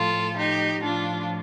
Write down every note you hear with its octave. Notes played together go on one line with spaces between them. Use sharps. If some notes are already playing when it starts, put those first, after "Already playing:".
Already playing: A2 F3 F4 A4
D#4 G4
A2 F3 D4 F4